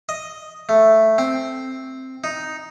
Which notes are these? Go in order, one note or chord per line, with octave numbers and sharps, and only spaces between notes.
D#5
A3
C4
D#4